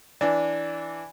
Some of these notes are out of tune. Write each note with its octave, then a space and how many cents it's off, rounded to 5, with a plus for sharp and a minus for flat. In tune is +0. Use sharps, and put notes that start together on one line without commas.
E3 +0 D4 -10